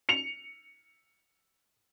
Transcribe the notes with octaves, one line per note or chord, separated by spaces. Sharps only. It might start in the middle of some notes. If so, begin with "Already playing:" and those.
C#7 F7